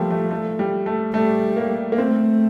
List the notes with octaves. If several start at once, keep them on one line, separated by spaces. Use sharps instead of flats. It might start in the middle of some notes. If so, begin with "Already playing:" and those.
Already playing: F3 G3 A3 A#3
A3
A3
G3
A3
G3 A3
A#3
A#3
A3 C4